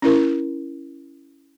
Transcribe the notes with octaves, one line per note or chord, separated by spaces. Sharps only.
C#4 E4 A#4